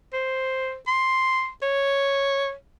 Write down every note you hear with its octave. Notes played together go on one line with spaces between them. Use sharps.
C5
C6
C#5